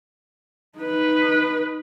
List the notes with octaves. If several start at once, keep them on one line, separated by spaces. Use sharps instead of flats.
D#4 B4